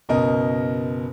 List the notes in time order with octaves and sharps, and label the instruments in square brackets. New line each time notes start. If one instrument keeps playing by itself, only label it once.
[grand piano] F#1 B2 A#4 D#5